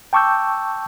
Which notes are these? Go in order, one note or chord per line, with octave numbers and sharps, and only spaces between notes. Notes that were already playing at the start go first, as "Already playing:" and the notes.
G5 A5 C#6 D6 E6 G6